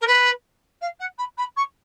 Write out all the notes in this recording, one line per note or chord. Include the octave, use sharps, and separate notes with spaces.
A#4
B4
F5
F#5
B5
B5
C#6